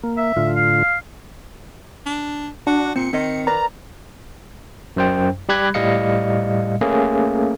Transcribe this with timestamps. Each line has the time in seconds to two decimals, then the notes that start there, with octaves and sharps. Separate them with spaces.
0.03 A#3
0.17 E5
0.37 A2 D3 F4
0.56 F5
2.06 D4
2.67 D4 F#4
2.96 A#2 C4 C#7
3.13 D#3 C4 D#5
3.47 A#4 B4 D5 A#5
4.97 F#2 C5 G5
5.49 G3 G4 B5 F#6 G#6
5.74 A2 G3 D#5 F5 C#7
6.81 A3 A#3 C#4 G#4